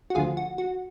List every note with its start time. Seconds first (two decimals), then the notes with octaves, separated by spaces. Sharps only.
0.10 F#4
0.15 D2 D3 F3 F4 G#4
0.37 F#4
0.58 F#4